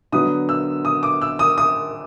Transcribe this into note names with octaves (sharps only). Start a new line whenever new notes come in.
D3 F#3 B3 D#6
E6
D#6
D6
E6
D#6
D#6